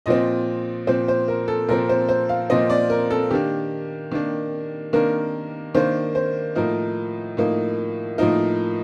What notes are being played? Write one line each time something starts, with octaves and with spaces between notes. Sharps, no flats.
A#2 F3 C4 D#5
A#2 F3 C4 C5
C5
A#4
A4
A#2 F3 C4 A#4
C5
C5
F5
A#2 F3 C4 D#5
D5
A#4
A4
D#3 A#3 D4 G4
D#3 A#3 D4
D#3 A#3 D4 A#4
D#3 A#3 D4 C5
C5
A2 F3 A#3 D#4 A#4
A2 F3 A#3 D#4
A2 F3 A#3 D#4 A#4